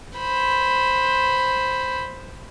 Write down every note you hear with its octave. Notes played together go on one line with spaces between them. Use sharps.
C5 B5